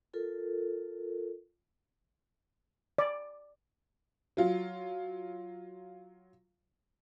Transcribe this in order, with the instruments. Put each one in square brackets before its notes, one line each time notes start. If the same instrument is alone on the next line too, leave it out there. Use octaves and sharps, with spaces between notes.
[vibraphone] F4 A4 A#4
[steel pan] D5
[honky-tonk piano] F#3 F4